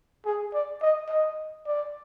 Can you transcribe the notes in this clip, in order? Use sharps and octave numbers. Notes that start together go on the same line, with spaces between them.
G#4
D5
D#5
D#5
D5